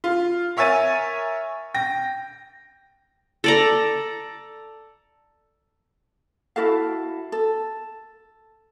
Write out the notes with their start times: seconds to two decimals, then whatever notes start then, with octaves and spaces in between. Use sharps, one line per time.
0.04 F4
0.57 A#4 C#5 E5 G#5 A6 D#7
1.74 G5 A#6
3.44 A4 D5 A#5
6.56 E4 F#4 A4 F5
7.32 A4